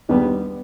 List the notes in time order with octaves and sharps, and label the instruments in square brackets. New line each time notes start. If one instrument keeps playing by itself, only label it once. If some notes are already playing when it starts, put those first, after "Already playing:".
[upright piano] D#2 D3 G3 [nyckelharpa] B3